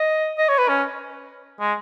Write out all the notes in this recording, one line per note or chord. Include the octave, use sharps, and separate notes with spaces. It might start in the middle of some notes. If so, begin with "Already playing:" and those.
Already playing: D#5
D#5
C#5
B4
C#4
G#3